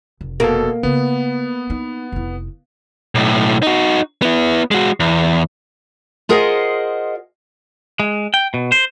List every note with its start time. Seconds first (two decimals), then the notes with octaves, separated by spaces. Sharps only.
0.21 F1
0.40 B2 A#3 A4
0.83 C#3 B3 F4
1.70 D#4
2.12 F1 E4
3.15 B1 A2
3.63 D#4 F#4
4.22 B3 E4
4.71 G#3 F#4
5.00 E2
6.29 F4 G#4 A#4 C5 D#5 F#5
8.00 G#3
8.34 G5
8.54 B2
8.72 C5